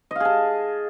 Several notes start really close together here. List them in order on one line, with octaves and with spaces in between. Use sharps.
D#5 F5 G#4 A5